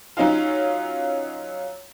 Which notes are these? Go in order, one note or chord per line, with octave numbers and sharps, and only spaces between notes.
F#3 C#4 D#4 F4